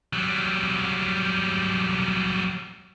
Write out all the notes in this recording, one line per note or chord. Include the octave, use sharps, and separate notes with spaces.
F#3 G3